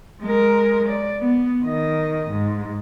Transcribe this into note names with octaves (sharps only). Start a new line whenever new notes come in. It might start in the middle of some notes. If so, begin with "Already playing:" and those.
G#3 A#4
D5
B3
D#3 D#5
G#2